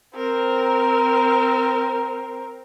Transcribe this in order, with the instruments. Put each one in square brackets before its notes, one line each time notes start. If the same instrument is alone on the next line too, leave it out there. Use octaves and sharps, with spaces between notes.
[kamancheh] C4 A#4